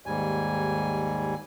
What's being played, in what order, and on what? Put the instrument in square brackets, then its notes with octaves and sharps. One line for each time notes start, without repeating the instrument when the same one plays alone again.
[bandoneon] D#2 G#2 G3 G#5